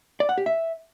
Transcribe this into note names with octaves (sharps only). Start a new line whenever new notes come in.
D5
F#5
G4
E5